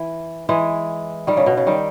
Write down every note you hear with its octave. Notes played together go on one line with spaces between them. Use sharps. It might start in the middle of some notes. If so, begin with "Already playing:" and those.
Already playing: E3
E3 G#3
D#3 G3
C#3
B2
C#3
D#3 G3